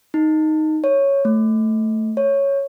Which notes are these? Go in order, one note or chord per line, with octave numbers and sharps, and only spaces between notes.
D#4
C#5
A3
C#5